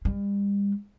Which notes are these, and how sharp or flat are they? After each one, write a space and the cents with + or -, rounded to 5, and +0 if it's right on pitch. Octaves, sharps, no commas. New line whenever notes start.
G3 +40